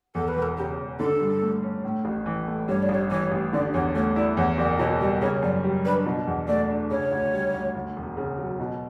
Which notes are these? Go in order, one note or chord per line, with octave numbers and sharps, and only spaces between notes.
E2 A4
B4
E1
A4
C#3 G4
E1
D3 A4
G2
A3
C#4
A2
A1
E3
A3
G2 C#5
D5
A1 C#5
E3 C#5
A1
D3 D5
E2 C#5
A3 C#5
E4 D5
E2 C#5
F#1 D5
B2 C#5
G3 D5
C#3 C#5
F#2 D5
G3
D4 B4
B2
E2
A3 D5
D4
C#3 C#5
D2
G3
D2
D2
E1
C#3
F#3
B2